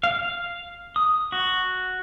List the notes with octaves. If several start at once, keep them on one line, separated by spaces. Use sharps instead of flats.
F5
D#6
F#4